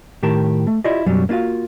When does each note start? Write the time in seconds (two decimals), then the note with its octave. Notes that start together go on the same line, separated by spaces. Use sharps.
0.23 A2 D#3 G4 A#4 A5
0.67 A3
0.84 E4 F4 G4 D5 D#5
1.07 F#2 B2 F#3 G3
1.29 A#3 D4 F4 F#4 F5